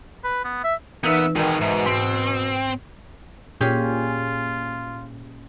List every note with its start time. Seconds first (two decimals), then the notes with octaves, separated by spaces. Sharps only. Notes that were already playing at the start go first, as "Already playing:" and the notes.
0.24 B4
0.45 B3
0.64 E5
1.04 A#2 E3 B3 D#4 B4 E5
1.36 B2 D#3 G#3 A#4 G5
1.61 G#2 E5 A#5
1.86 G#2 C4
3.61 A#2 C#4 F4 G4 G#4